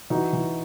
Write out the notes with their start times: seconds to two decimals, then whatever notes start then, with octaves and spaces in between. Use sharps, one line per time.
0.10 E3 D#4 F#4
0.33 E3